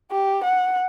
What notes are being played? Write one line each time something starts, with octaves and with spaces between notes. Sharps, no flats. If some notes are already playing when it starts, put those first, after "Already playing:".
G4
F#5